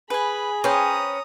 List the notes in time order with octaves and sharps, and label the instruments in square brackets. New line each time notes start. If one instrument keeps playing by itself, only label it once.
[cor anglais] G#4 [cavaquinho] B4 G#5 [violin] B5
[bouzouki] C#4 [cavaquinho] B4 C5 G5 [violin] A#5 D#6